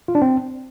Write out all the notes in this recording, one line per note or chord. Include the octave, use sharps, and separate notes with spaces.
F4
D4
C4